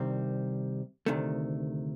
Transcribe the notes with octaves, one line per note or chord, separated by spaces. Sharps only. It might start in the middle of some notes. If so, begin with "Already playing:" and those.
Already playing: C2 C3 D#3 G3 C4
D2 C3 D#3 A3